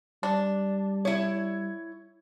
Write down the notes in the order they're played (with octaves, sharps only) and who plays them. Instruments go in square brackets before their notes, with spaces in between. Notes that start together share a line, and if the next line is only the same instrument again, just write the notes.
[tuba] G3 [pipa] D4
[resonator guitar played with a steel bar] E4 C#5